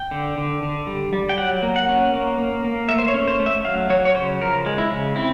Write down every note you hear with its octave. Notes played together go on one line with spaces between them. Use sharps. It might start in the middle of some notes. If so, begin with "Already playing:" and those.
Already playing: G5
D3
D3
D3
G3
G3
G5
F#3 F#5
A#3
F#5
C#4
A#3
A#3
A#3
A3 E5
C5
C#5
C#4
C5
A3
E5
F#3 F5
F#3 C#5
C#5
C#3 C5
F3 A#4
G#3
E4
C#3
C4 E4